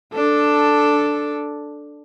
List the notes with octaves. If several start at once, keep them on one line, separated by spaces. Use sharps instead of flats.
D4 A4